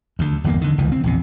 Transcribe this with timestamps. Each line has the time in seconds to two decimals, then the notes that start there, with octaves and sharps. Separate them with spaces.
0.19 D2 D3
0.44 G1 E2 B2 A#3
0.61 D3 D#3
0.78 F1 C#2 D#3 E3
0.92 C4
1.04 A#1 E2 C3